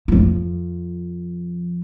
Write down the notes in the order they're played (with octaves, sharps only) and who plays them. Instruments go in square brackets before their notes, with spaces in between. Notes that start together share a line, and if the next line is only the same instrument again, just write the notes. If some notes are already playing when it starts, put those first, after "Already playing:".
[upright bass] F2 F3